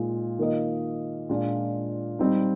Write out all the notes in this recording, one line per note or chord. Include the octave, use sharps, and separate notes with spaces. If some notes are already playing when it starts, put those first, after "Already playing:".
Already playing: A#2 G#3 D#4
D#3 A#3 F4 A#4 D#5
A#2 G#3 D4 F4
G3 C4 D#4